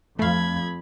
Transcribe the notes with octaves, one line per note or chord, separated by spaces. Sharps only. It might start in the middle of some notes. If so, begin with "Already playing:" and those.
F2 A3 F5 B5 G#6